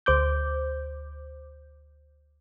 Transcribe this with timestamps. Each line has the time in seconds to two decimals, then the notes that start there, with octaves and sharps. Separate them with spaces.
0.06 D2 C5 D6 G6